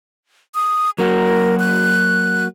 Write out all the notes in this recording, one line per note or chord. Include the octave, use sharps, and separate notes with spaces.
D#6
F#3 A#3 F#4 A#4
F#6